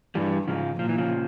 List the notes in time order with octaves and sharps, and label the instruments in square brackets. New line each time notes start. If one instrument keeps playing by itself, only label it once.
[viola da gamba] G2 [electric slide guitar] E3 G3
[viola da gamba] G#2 [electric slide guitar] C#3 F3
[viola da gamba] A#2 [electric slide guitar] F3
[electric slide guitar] E3
C#3 F3